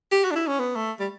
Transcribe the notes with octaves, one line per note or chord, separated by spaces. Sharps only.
G4
F#4
D4
E4
C#4
B3
A3
G3